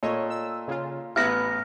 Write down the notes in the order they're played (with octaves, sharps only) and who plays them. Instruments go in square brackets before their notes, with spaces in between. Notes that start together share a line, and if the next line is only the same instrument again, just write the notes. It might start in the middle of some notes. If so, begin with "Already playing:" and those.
[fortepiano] A#2 A4 D#5 [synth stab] C#5
[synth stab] E6
C#3 F4
[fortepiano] A1 B3 [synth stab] E4 B4 [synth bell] F6 A#6